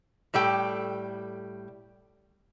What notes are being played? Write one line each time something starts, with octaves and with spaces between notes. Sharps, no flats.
A2 G3 A4 G5